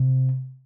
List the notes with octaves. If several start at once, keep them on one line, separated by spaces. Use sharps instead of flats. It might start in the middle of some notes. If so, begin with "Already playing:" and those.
Already playing: C3